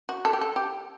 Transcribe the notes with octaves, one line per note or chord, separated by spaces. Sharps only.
F#4
A4
G4
A4
G4